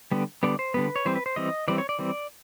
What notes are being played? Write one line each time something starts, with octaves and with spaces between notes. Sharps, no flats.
D3 G3 B3
D3 G3 B3 D5
C5
D3 G3 B3 B4
C#5
E3 G3 C4 C5
B4
C5
E3 G3 C4 D#5
E3 G3 C4 D5
C#5
D5
E3 G3 C4